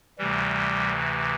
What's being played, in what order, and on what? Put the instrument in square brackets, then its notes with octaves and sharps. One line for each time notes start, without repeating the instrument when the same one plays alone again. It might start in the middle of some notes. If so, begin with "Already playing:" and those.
[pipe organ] D2 C3 E3 G3